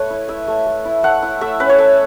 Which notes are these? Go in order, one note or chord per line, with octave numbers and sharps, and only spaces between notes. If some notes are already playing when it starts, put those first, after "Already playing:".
Already playing: A3 B4 C#5
E4
E4 E5
A3
A3
E4
A3 F#5
E4
A3 E5
C#4 B4
C#5
A3 E5